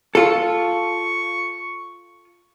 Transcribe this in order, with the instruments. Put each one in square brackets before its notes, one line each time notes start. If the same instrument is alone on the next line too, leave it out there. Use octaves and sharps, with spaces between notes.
[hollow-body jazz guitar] F4 A4 [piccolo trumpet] C#6